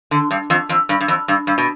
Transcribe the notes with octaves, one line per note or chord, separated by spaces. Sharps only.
D3
G2
F2
F2
G2
G2
F2
G2
G2
B2